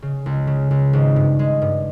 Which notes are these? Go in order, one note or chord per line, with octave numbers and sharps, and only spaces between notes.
C#3
C#2
C#3
C#2
G#1
G2
G#3
G2